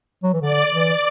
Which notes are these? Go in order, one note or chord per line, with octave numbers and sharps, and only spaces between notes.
F#3
E3
D3 D5
E3 D5